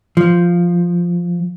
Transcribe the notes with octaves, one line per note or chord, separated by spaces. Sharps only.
F3